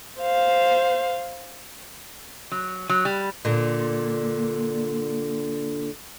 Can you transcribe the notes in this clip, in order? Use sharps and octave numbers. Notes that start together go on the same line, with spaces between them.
C5 F5
F#3
F#3
G3
A#2 D3